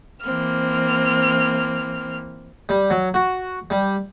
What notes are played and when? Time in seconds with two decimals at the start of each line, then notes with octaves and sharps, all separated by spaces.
0.23 E3 A#3 C4 F6
2.69 G3
2.90 F#3
3.14 F#4
3.70 G3